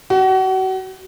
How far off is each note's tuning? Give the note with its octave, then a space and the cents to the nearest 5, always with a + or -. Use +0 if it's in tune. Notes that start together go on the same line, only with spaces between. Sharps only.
F#4 +35